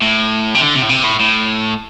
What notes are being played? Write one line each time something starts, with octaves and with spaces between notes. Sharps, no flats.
A2
C3
D3
C3
A2
C3
A2
A2